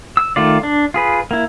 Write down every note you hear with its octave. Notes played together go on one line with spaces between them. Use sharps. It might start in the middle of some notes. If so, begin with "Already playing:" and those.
E6
D#3 A3 F4 D5
D4
F4 G#4 B4
A#3 E4